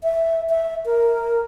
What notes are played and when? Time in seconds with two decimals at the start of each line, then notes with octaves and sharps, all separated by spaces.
0.03 E5
0.50 E5
0.86 A#4